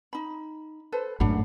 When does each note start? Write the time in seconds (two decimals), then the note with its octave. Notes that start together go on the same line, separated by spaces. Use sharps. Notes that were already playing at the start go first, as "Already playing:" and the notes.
0.13 D#4 B5
0.92 A4 B4 C5
1.20 G#1 F#2 A2 D4 F#5 B5